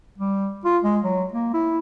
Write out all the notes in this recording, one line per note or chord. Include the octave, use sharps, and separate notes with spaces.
G3
F4
G#3
F#3
A#3
E4